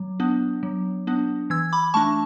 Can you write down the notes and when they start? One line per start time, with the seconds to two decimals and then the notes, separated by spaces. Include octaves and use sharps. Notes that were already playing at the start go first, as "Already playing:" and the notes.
Already playing: F#3
0.20 B3 D4
0.63 F#3
1.07 B3 D4
1.50 E3 E6 G#6
1.73 B5 D6
1.94 A3 D4 A5 C#6